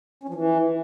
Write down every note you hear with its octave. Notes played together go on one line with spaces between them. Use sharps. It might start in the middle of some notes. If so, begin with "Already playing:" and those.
C#4
F3
E3